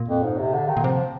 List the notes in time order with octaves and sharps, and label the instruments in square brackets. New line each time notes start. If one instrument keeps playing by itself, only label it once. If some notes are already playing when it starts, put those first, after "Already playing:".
Already playing: [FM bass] A#2
[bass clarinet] F2
G#2
C3
D3
D#3
[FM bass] A#2
[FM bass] C3 [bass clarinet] F3